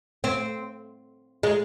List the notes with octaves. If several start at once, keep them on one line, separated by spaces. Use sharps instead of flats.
C4
G#3